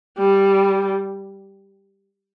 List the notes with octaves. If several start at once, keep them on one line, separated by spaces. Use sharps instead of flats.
G3